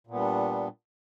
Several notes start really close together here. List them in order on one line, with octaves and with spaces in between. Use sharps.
A#2 B3 G3 D4